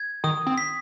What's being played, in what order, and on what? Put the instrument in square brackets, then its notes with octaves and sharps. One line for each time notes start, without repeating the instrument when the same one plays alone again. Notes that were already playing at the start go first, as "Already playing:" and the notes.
Already playing: [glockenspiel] G#6
[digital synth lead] D#3 [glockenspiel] D#6
[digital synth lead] C4
[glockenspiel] B6